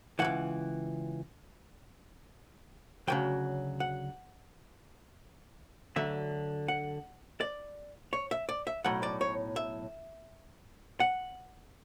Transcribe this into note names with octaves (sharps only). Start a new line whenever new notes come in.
C#3 E3 F#5
C#2
D2 C#3 F#3 G5
F#5
D2 D3 F#3 E5
F#5
D5
C#5
E5
D5
E5
B1 A2 F#3 F#5
D5
C#5
E5
F#5